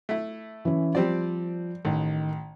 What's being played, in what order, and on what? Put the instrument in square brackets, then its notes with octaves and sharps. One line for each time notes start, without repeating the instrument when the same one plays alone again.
[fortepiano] A3 E4
[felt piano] E3 C#4
[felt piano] F3 [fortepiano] G3 C4 D5
[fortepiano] A1 [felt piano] D#3